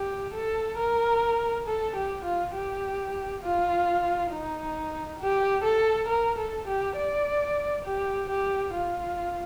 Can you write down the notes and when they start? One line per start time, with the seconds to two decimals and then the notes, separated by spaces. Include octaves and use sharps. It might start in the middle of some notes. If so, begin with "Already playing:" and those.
Already playing: G4
0.34 A4
0.77 A#4
1.67 A4
1.96 G4
2.24 F4
2.54 G4
3.43 F4
4.31 D#4
5.20 G4
5.64 A4
6.08 A#4
6.38 A4
6.68 G4
6.96 D5
7.85 G4
8.29 G4
8.74 F4